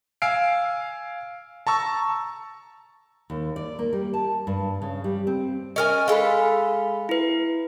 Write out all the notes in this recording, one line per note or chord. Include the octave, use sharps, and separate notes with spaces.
F5 G#5 E6 F6 C7 D7
A5 A#5 C#6 E6
D#2
D5
A#3
G3
A5
G2
C#3
G3
C4
C#4 A#4 D#5 G#5
G#3 A4 F5 B5
E4 B4